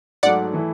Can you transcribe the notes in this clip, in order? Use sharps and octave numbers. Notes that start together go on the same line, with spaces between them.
G#2 F#3 A3 D5 F#5
E3 A3 E4